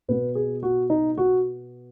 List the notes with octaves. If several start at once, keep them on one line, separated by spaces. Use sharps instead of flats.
B2 B3 B4
G#4
F#4
D#4
F#4